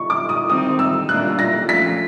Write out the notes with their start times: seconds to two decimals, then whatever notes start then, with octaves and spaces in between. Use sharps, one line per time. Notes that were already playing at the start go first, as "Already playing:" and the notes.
Already playing: C#6
0.10 D6
0.29 D#6
0.50 D#3 G3 C4 D#4 D#6
0.79 E6
1.09 A#2 G3 A#3 D4 F4 F#6
1.39 A#6
1.69 F3 A3 C#4 F4 B6